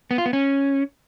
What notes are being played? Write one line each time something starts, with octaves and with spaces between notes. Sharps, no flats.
B3
F4
B3
C#4